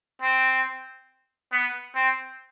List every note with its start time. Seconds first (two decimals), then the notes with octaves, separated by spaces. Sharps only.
0.22 C4
1.52 B3
1.95 C4